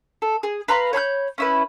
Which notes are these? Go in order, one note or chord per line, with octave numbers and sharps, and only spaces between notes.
A4
G#4
B4 F5 A#5 C6
C#5 B5 C6 G6
C#4 E4 B4